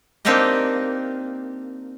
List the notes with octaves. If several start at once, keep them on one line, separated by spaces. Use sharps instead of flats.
A#3 C4 D4 D#4 G4 D#5